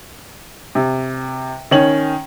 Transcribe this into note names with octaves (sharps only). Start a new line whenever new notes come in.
C3
D#3 C#4 F#7